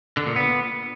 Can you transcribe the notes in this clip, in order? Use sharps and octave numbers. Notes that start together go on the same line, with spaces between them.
D3
A#2
B3